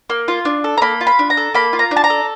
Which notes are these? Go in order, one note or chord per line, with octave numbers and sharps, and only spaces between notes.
A#3
F4
D4
A4
A#5
A#3 B5
F4
B5
D4
A#5
A4
A#3 B5
F4
A#5
D4
A5
A#5
A4